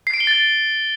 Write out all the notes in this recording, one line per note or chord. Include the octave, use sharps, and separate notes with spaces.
C7
D7
G7
A6